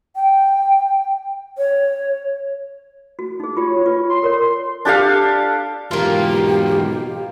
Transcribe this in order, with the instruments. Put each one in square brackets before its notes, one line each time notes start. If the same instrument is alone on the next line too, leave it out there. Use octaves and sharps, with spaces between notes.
[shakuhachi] G5
C#5
[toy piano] F#4
D#4 G#4
[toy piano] F4 G4 [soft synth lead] C#5
[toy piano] F4 B4
[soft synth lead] C6
[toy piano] A4 A#4 C#5
[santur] D4 G4 A4 F5
[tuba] B1 [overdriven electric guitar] E2 G#2 [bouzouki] A#3 F4 [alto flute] G4